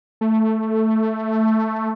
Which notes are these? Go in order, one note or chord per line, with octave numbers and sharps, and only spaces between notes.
A3